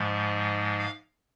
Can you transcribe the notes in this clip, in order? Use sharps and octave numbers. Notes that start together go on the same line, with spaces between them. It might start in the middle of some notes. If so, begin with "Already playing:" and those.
Already playing: G#2 F3 G#3
F5